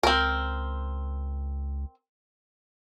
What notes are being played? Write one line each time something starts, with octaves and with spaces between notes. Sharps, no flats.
C#2 C4 A#4